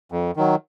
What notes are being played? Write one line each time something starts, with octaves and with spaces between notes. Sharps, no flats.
F2
D#3 F#3